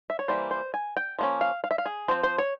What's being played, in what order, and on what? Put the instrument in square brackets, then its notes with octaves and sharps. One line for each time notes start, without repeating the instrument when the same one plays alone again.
[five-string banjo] E5
C#5
E3 G3 A#3 C5
C5
G#5
G5
F3 A#3 C#4
F5
F5
E5
F5
G#4
F3 C4 C5
C5
C#5